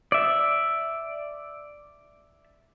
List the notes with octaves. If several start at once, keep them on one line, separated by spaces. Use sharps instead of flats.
D5 E5